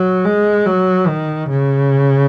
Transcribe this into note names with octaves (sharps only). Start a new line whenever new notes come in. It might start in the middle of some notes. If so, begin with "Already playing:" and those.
Already playing: F#3
G#3
F#3
D#3
C#3